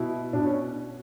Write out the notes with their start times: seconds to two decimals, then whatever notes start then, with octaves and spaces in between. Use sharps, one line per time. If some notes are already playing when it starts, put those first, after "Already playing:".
Already playing: B2 E4
0.33 B2 D4
0.45 C#4